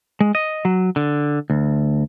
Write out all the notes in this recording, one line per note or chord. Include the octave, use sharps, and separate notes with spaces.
G#3
D#5
F#3
D3
D2